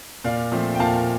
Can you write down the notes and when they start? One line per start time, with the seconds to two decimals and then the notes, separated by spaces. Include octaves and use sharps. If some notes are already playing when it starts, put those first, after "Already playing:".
0.24 A#2 D5 F5
0.52 F3 A3 C4
0.75 G5
0.80 A#2 F5 A5